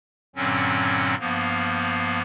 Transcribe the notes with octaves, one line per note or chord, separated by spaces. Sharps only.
G2 A#2 D3 F#3 C4 C#4
G2 F3 A#3 B3